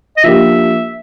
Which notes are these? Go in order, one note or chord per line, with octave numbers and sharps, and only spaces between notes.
D#5
F3 A#3 D4 G4 E5